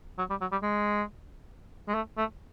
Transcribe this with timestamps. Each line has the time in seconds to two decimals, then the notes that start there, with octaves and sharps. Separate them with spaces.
0.18 F#3
0.30 G3
0.41 F#3
0.52 G3
0.63 G#3
1.88 G#3
1.94 A3
2.18 A3